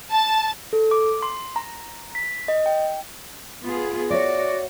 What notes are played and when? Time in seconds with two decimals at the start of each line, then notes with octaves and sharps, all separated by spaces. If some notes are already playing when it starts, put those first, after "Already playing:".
0.11 A5
0.73 A4
0.91 D6
1.23 C6
1.56 A#5
2.15 B6
2.48 D#5
2.66 G5
3.65 B3 F4 G#4
4.10 F#4 C#5 D5 E5